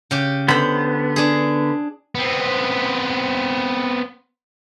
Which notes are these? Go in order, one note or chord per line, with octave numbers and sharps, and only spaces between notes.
C#3 G4
D3 B3 C5 B5
D4 G#4
B3 C4